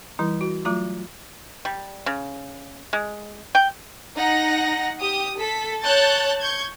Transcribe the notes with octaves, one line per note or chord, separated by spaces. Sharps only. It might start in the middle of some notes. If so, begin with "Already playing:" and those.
E3 G3 E4
F#4
F#3 A3 F4 A#5 D6
G3
C#3
G#3
G5
D#4 F#5 A#6
G4 D#6
A4 B6
C#5 A5 F#6 G6 A6
C#6 G6 G#6